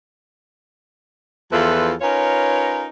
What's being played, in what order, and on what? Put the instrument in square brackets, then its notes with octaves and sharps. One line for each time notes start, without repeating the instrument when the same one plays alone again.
[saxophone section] E2 F3 E4 F4 A4 B4
C#4 D#4 F4 A#4 B4 C#5